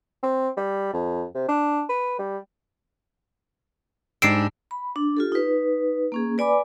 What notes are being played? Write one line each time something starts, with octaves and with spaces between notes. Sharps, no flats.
C4
G3
F2
C3
D4
B4
G3
G#2 G3 G#3 D4 E6 C7 D7
B5
D4
F4 G4 A4
D#4 B4
A#3 C#4 G#4
B4 D5 G#5 B5 D6